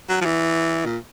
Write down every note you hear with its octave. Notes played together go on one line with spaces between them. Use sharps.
F#3
F3
E3
A#2